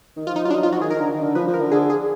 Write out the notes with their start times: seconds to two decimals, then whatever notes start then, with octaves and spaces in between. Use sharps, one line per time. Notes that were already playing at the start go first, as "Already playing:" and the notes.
0.17 D#3
0.27 F3 F4
0.36 D#4
0.45 F#3 F4
0.50 D4
0.54 D#4
0.63 F3 F4
0.73 F#4
0.81 D#3 G#4
0.90 A#4
1.00 D3
1.11 D#3
1.22 D3
1.35 F3 B4
1.47 F3
1.54 A#4
1.60 D3
1.71 D3 G#4
1.90 G#4